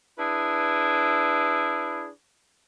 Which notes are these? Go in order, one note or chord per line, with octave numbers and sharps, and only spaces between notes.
D4 E4 G#4 B4